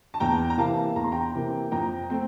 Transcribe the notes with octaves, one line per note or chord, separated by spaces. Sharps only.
A5
E2 G5 A#5
A#5
C3 E3 A#3 F5 A5
E2 A#5
C6
G5 A#5
C3 E3 A#3
F2 G5 A#5
A3 C4